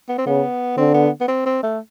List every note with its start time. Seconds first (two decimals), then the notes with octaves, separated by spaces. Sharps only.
0.09 B3
0.18 C4
0.26 C#3 B3
0.77 D3 C4
0.94 B3
1.21 B3
1.28 C4
1.46 C4
1.63 A3